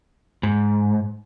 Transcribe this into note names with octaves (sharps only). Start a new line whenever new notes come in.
G#2